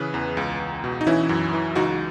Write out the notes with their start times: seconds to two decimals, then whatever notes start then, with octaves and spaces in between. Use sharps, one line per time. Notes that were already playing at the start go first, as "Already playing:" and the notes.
Already playing: C#3 E3 G#4 B4
0.14 E2
0.37 C#2
0.60 C#2
0.84 B2
1.01 D#4
1.07 E3 C#4 E4
1.29 F#2
1.53 E3
1.75 C#2 D#4 F#4